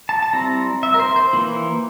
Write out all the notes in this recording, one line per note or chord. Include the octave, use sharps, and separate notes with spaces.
A5
A5
G3 C4 E4 A#5
E5
A#4
C5
C5
E3 A#3 E4